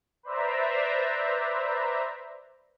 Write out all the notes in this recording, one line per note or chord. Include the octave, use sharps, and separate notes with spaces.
B4 C5 D5 E5 A#5